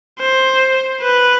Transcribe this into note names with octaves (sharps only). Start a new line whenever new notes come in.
C5
B4